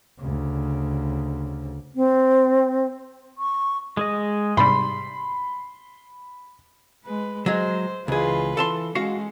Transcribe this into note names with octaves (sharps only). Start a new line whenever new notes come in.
D2 C#3
C4
C#6
G#3 G#4 D#5
G#2 C3 G3 B5 C6
G#3 B4
F#3 G#3 C5
C#2 E3 F4 G#4 B4
E3 A4 A5 C6
G#3 C#4 F#4 F5 F#5